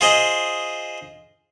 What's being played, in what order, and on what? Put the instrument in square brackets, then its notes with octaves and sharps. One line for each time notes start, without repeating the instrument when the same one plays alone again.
[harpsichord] F4 G#4 C5 D#5